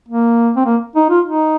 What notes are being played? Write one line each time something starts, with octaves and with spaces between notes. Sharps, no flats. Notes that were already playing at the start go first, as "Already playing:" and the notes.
A#3
C4
A#3
D#4
F4
D#4